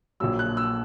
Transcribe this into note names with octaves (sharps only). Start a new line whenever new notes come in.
A#1 A#2 F#3 E6
F#6
E6